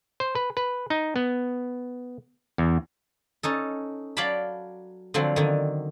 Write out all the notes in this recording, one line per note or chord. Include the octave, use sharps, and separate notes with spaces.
C5
B4
B4
D#4
B3
E2
C#4 D#4 A4
F#3 D5 F5 G5 A5 B5
D3 F3 F#3 C4
D3 D#3